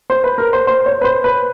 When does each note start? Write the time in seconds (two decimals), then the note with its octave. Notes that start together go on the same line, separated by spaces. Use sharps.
0.10 C5
0.24 B4
0.38 A#4
0.53 C5
0.67 C5
0.86 C#5
1.01 B4
1.04 C5
1.24 B4